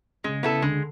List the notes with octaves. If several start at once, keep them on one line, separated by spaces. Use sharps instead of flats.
C#3 G#3
C#3 B3 E4 A4
D3 G#3